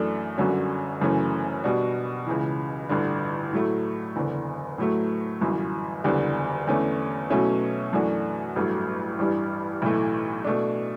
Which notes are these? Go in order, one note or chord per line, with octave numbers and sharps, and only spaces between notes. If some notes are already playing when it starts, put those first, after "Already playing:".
Already playing: F#2 E3 A3 D4 A4
G1 F#2 D3 F#3 C#4
F#1 F#2 E3 A3 C#4
B2 G3 D4 F#4
C#2 C#3 E3
A1 G2 D3
A2 F#3 A3
F#1 E2 D3
A2 F#3 A3
G1 F#2 E3
F#1 E2 D3 G3 D4
E2 D3 A3 C#4
B2 F#3 A3 C#4 E4
F#2 E3 A3 D4 F#4
A1 G2 F#3 A3
A1 G2 E3 G3
B1 A2 E3 A3
B2 A3 D4